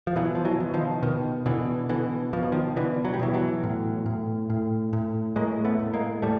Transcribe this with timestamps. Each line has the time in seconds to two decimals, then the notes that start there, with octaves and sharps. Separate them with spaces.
0.07 F3
0.16 B2 E3 F#3
0.35 F3
0.45 E3 F#3
0.60 B2
0.74 D#3 F3
1.03 B2 D#3
1.46 B2 D3 E3
1.89 B2 D3 E3
2.33 B2 F3
2.43 F#3
2.52 D#3 F3
2.76 B2 D3 E3
3.05 F#3
3.14 G3
3.19 B2 E3 F#3
3.34 E3 F#3
3.63 A2
4.06 A2
4.50 A2
4.93 A2
5.36 A2 G#3 A#3
5.65 A3 B3
5.79 A2
5.94 G#3 A#3
6.22 A2 G3 A3